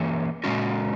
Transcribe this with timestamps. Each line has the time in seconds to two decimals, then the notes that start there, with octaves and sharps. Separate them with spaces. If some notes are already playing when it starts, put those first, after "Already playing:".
Already playing: E3 A#3 C#4 G#4
0.44 A#2 G#3 C#4 F#4